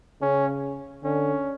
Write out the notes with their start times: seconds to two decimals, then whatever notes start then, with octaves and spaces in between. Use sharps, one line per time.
0.21 C#3 C#4
1.04 D3 C#4